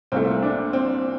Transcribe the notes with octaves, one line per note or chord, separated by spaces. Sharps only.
C2 A#2 A3 C4
D4
C4